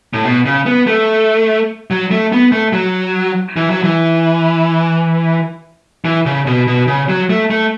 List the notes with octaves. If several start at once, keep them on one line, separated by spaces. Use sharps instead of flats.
A2
B2
C#3
B3
A3
F#3
A3
B3
A3
F#3
E3
F#3
E3
E3
C#3
B2
B2
C#3
F#3
A3
A3